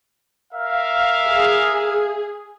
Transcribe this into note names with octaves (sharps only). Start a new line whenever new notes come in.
A#4 E5 F5
G#4